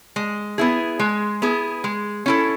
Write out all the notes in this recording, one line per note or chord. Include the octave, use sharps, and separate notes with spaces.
G#3
B3 E4 G#4
G#3
B3 E4 G#4
G#3
C#4 E4 A4